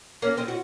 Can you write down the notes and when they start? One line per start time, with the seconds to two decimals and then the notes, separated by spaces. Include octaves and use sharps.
0.22 A#3 C#4
0.37 C4 D#4
0.48 F#4